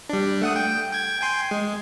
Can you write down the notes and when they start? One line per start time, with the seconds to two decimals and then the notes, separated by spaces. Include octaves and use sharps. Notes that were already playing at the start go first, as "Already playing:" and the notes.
0.09 G3 D4
0.42 A3 F#5 D#6
0.56 G5
0.92 G5 G#6
1.22 G5 G#5 C6
1.51 G#3